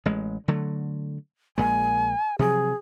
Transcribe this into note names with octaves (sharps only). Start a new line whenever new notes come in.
A1 G#3
D3 F#3 A3
A#1 A#2 G#3 G#5
C3 F3 F#3 G#4